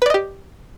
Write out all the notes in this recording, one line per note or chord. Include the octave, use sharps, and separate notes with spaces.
G4 B4 D5 D#5